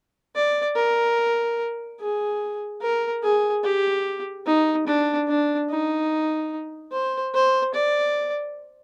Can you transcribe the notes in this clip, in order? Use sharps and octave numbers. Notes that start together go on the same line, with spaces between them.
D5
A#4
G#4
A#4
G#4
G4
D#4
D4
D4
D#4
C5
C5
D5